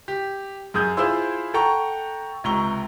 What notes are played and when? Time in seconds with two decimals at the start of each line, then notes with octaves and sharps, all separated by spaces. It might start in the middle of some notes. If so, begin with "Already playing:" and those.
0.08 G4
0.74 F#2 G#4 D#6 G6
0.97 E4 F4 G#4 C5 C6 E6
1.54 A4 F#5 G5 A#5 C#6
2.44 C#2 C3 A#5 C#6 G7